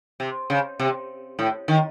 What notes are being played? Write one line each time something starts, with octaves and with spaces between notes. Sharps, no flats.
C3
C#3
C3
A2
D#3